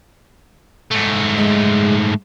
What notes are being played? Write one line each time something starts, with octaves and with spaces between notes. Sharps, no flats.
G#2 A3
G#3